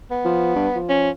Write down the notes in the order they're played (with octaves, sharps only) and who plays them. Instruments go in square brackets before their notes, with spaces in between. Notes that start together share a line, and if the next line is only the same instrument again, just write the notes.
[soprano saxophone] B3
[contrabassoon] F3
G2
F3
[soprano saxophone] C#4